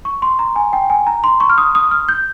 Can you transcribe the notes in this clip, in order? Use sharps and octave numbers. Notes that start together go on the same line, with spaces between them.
C#6
C6
A#5
G#5
G5
G#5
A#5
C6
C#6
F6
D#6
D#6
F6
G6